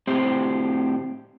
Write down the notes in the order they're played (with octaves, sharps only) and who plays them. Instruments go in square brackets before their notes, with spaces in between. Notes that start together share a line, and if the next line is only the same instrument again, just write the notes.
[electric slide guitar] A2 C4 G4 C5